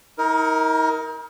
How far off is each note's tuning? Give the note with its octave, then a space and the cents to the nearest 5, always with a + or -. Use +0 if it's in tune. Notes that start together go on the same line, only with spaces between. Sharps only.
D#4 +40 A#4 +0